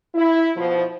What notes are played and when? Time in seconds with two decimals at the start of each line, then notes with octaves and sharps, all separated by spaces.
0.15 E4
0.57 B2 F3